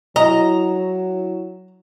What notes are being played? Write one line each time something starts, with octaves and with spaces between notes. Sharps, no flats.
F#3 E4 D#5 A#5